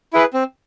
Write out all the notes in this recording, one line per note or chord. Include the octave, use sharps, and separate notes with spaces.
E4 G#4 B4
C4